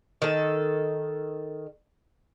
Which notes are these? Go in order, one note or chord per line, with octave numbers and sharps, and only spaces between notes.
D#3 A4